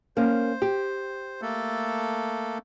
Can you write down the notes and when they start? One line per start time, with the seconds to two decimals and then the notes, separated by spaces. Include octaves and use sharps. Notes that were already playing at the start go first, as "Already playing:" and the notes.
0.17 A#3 C#4 C5
0.62 G4
1.42 A3 A#3 A4